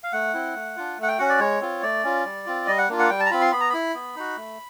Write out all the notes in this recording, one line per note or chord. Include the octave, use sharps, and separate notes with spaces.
F5
A3 F#5
C4 E4
A3
D4 F4
A3
F#5
G5
C#4 F#4 F#5
D5
G#3 C#5
C4 F4
A3 D5
C#4 F4
G3
C4 F4
G3 D#5
F#5
A#3 D4 F4
F#5
G3 G5
A5
A#5
C4 F4 B5
C6
B3 B5
A#5
E4 B5
B3
D#4 F#4
A3